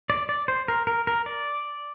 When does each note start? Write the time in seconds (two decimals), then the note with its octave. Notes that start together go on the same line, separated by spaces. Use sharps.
0.10 D5
0.29 D5
0.48 C5
0.68 A#4
0.87 A#4
1.07 A#4
1.26 D5